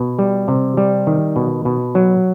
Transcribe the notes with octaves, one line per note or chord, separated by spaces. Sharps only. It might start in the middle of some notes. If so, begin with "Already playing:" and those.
Already playing: B2
G3
C3
G3
D#3
B2
B2
F#3